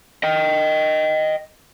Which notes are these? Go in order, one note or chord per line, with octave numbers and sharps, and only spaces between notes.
D#5 G5